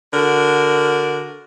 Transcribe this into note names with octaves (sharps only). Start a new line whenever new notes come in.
D3 F#4 A#4